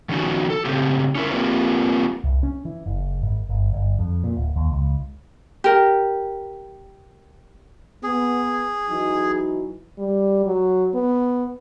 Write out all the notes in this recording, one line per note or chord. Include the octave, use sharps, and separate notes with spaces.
D#3 F3 B3 C#4 D#4 F#4
A4
A2 C#3 C4 G4
C#4 E4 A#4
A#3 C4 F4 G4 A#4 B4
C2
C#4
E3
F#1
G#1
G1
G1
F2
A#2
D1
D#2
C#2
G4 A#4
B3 G#4
E3 F#3 D#4
G3
F#3
B3